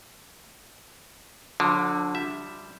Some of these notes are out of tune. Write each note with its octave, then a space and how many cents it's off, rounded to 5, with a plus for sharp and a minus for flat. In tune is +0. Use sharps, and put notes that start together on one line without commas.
D3 +0 F3 +45
G3 +0 E5 +0